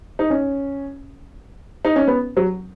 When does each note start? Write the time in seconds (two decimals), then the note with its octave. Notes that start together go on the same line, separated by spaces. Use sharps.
0.19 D#4
0.30 C#4
1.85 D#4
1.96 C#4
2.07 B3
2.37 F#3